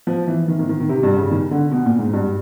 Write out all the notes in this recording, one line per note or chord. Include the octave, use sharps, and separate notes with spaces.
F3
E3
D#3
D#3
D#3
D#3
C3
G2
C#3
D#3
D3
B2
A#2
G#2
G2